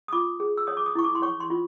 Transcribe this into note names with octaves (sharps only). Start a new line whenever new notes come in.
D#6
F4 D6
G#4
E6
C#5 D#6
D6
D#6
E4 C#6
D6
C6
C#5 C#6
C6
F4